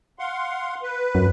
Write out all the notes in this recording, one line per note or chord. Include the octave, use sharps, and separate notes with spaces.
F5 F#5 C6
B4
F#2